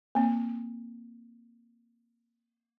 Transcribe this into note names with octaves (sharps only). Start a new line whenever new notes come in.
A#3 C4